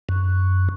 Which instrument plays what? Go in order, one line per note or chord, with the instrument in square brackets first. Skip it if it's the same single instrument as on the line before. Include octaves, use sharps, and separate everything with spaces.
[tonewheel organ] F#2